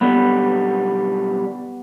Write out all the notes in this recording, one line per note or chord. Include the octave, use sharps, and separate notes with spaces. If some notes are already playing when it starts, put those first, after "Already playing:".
B1 D3 G3 B3